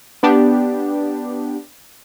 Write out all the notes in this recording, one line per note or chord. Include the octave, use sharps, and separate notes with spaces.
B3 D4 G4